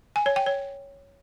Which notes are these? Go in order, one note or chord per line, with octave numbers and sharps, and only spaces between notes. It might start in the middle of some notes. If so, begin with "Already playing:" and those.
G#5
C#5
G5
C#5